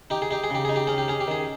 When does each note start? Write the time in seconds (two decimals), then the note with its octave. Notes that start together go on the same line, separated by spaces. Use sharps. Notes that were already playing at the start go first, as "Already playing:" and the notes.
0.10 D#4 G4
0.22 G#4
0.31 D#4 G4
0.44 G#4
0.50 C#3 G4
0.65 D#4 G#4
0.76 G4
0.87 C#4 G#4
0.98 G4
1.08 C#4 G#4
1.20 G4
1.28 D#3 G#4